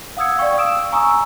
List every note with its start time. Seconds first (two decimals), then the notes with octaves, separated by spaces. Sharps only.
0.17 F5 F#5 D#6 E6 G#6 C#7
0.39 D5 F5 G5 C#6
0.57 D#6 E6 D7 E7
0.92 G#5 A#5 C#6 D#6 E6